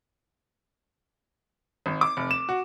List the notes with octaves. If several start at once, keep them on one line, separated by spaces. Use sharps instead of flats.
G#1
D6
F1
E7
F#4